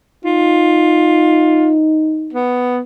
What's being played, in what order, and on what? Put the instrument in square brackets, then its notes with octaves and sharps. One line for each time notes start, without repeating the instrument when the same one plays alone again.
[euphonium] D#4 [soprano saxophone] F4
[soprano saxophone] B3